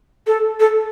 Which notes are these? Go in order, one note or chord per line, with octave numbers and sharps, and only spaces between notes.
A4
A4